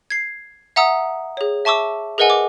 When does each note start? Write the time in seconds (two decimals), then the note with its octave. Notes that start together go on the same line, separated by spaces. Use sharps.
0.10 G#6 C7
0.76 E5 F#5 A#5 D#6 E6
1.37 G#4 C#5
1.65 E5 A5 C#6 D6 E6
2.18 G#4 A#4 B4 D#5 F#5 G#5
2.30 D6